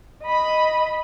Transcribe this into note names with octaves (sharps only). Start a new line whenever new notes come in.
D#5 B5